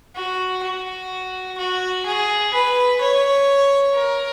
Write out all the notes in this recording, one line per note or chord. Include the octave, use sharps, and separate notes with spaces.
F#4
F#4
F#4
G#4
B4
C#5
A#4